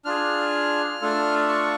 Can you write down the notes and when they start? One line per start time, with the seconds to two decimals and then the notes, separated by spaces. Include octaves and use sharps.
0.05 D4 F4 G#4 F6
1.01 A3 D4 F4 A4
1.49 C#6